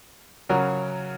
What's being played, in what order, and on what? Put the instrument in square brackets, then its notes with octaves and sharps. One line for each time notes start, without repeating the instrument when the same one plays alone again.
[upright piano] C#3 F#3 C#4 F#4 A#4